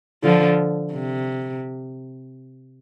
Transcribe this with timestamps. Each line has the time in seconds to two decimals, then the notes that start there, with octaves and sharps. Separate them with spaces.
0.23 D3 F3
0.92 C3